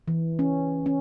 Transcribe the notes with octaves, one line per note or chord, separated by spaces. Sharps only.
E3
C#4
C#4